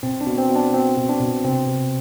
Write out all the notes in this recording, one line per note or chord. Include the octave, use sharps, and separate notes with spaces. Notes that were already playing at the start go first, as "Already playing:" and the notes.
B2 C4
D4
B2
C4
B2
D4
B2 C4
B2
D4
B2
C3 C4
C3